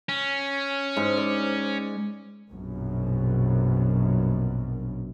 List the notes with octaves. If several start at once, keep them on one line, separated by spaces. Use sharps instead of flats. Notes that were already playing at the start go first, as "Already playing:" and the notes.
C#4
G#2
D5
A#1 F#2 B2